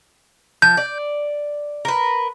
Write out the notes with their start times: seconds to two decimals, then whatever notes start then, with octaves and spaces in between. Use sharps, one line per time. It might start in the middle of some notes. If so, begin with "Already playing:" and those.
0.62 F3 G6
0.77 D5
1.85 A#4 B4